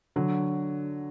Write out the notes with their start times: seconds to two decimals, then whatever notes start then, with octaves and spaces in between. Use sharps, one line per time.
0.16 D3 F#3